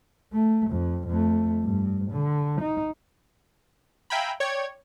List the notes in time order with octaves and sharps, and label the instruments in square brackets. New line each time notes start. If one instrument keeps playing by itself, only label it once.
[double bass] A3
F2
F2 A3
G2
D3
D#4
[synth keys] E5 F5 G5 G#5 A#5 B5
C#5 D5 G5 G#6